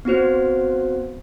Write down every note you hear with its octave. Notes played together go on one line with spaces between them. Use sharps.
B3 C4 F#4 C5